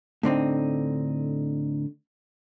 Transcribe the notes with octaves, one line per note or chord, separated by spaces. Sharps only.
A2 D3 C4 D#4